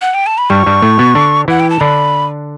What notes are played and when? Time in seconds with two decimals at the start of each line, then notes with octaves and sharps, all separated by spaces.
0.02 F#5
0.14 G5
0.26 A5
0.38 B5
0.50 G2 G3 C#6
0.66 G2 G3
0.82 A2 A3
0.99 B2 B3
1.15 D3 D4
1.48 E3 E4 F#5
1.60 G5
1.70 A5
1.80 D3 D4 B5